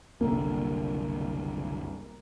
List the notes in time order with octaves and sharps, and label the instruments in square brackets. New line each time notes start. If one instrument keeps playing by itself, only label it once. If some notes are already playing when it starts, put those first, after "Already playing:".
[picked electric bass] F#1 C2 D3 [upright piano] A#3